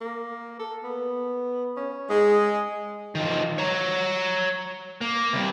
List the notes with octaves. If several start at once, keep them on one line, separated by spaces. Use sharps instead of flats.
A#3
A4
B3
C#4
G#3 G#4
D#3 F3
C#5 A#5
A#3
C3 G3